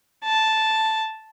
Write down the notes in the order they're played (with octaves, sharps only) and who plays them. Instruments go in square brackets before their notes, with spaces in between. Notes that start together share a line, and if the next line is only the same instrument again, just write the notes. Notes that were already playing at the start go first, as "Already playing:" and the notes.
[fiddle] A5